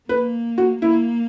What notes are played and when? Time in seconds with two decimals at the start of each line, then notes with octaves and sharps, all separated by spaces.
0.09 A#3 B4
0.58 F#4
0.82 A#3 E4